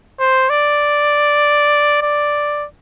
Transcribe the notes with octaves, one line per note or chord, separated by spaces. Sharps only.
C5
D5
D5